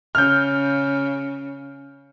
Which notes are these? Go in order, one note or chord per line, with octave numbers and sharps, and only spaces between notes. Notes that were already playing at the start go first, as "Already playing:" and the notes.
C#3 F6 G6